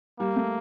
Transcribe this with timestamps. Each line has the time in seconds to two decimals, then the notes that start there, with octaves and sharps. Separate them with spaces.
0.19 G3 A#3
0.36 A3